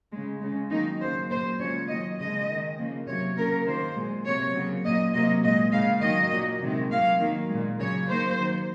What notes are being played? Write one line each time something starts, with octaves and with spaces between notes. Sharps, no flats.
C#3 G#3
C#3 G#3
D#3 F#3 A#3 D#4
C#3 F#3 A#3 C5
A#2 F#3 A#3 C5
C#3 F3 G#3 C#5
D#3 F#3 A#3 D#5
C#3 F3 G#3 D#5
D#3 G#3
C#3 F3 A#3
C3 F#3 A#3 C#5
C#3 F#3 A#3 A#4
D#3 F#3 A#3 C5
A#2 G#3
C3 F#3 A#3 C#5
C#3 F#3 A#3
A#2 F#3 A#3 D#5
C3 F#3 A#3 D#5
A#2 G#3 D#5
C#3 G#3 F5
D#3 F#3 A#3 D#5
A#2 F#3 A#3
C3 D#3 G#3
C3 F#3 A#3 F5
D#3 F#3 A#3
A#2 G#3
C#3 F#3 A#3 C#5
D#3 F#3 A#3 C5
D#3 F#3 A#3